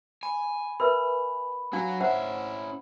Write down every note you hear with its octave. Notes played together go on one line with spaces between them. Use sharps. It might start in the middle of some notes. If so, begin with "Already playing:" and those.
G#5 B5
A#4 B4 E5 B5
F#3 D4 F#4 F5
C#4 E4 C5 E5 F#5